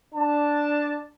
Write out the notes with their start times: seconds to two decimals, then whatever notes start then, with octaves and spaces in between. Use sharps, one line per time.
0.14 D4 A5